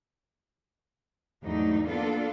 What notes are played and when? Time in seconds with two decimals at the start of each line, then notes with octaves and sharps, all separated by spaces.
1.45 E2 G#2 F#3 A3 D4 D#4
1.88 A#3 B3 D4 F4 A4